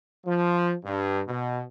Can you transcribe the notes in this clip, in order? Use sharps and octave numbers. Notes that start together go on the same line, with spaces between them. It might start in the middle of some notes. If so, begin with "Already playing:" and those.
F3
G2
B2